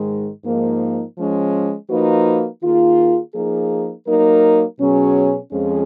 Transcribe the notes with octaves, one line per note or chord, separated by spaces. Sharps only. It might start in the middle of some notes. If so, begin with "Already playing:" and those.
Already playing: G#2 D#3 G#3
G#2 F3 A#3 D#4
F3 G#3 C#4
F3 A#3 D#4 F#4 B4
D#3 A#3 F4 G#4
F3 A#3 D#4 G#4
F#3 A#3 D#4 A#4
B2 F#3 C#4 G#4
F2 F3 G#3 C#4 G#4